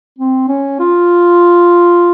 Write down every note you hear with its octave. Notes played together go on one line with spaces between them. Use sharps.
C4
C#4
F4